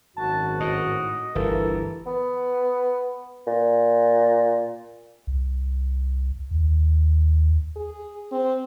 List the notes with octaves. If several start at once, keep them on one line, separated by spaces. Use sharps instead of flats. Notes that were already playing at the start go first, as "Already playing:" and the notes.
G#1 F#2 F#4 A5
A2 D#5
G1 D2 E3 A4 A#4
B3
A#2
C2
D#2
G#4
C4